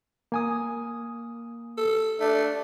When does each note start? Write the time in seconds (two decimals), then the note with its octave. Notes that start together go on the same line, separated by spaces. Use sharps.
0.32 A#3 G#5 D#6
1.78 A4
2.20 A3 D4